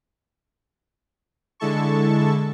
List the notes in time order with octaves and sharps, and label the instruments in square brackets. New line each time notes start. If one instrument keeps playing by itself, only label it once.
[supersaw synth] D3 G#3 E4 A4 A5 C#6